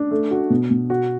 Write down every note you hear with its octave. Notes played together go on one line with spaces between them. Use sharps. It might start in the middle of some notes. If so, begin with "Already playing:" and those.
Already playing: D4
A3
F#4
B2
B2
F#4